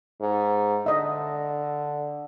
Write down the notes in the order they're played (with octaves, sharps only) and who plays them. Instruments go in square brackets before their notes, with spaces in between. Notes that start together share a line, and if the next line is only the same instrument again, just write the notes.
[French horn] G#2
[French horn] D3 [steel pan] D#5 E5